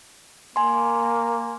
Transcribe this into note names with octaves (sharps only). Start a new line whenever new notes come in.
A#3 G#5 C6